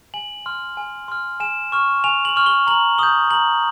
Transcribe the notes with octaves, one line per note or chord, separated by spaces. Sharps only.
G#5 F#7
C6 F6
G#5
C6 F6
G#5 E7
C#6 F6
G#5 F7
F#7
C#6 F6
G7
A#5 F#7
D#6 G6 G7
A#5 F#7